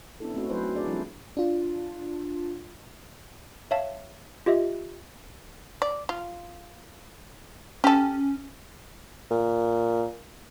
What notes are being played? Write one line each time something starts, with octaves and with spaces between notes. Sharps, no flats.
B3 C#4 D4 E4 A4
A3 C4 C#4 D#4 F#4
F#3 A3 E4 B4 C5
D#4 C5
D4 G#4 D5
F3 G3 C4 D4 E4
D4 F4
C#5 E5 F5 A5
F4 G4 D#5 E5
D5
F4
C#4 G4 A4
A#2